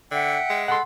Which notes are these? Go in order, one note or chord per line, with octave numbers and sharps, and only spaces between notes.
D3 E5 F#5 G5
G#3
A4 F#5 B5 C6